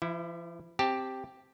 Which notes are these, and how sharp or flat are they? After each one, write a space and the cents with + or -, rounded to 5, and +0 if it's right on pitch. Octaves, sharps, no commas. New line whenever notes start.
F3 -45 E4 +0
C4 +5 G4 +0 A5 +0